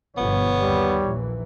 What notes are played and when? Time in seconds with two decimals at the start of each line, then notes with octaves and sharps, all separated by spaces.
0.17 G1 B2 F3 B3 C#5
0.60 D#2 G3
1.06 A#1 E3